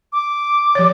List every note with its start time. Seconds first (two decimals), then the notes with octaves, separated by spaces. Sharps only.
0.12 D6
0.75 F3 C#5